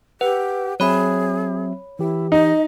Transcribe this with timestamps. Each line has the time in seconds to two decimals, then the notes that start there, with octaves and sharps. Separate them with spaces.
0.21 G4 B4 F#5
0.80 F#3 C4 G#4 C#5 E5 B5
1.99 E3 E4 G4
2.32 D#4 D#5